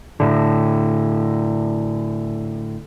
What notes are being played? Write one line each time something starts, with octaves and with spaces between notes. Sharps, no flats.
A2 D3